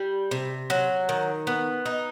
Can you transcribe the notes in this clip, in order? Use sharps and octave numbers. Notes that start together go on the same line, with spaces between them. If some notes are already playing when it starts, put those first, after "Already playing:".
Already playing: G3
C3
F#3
D#3
B3
D#4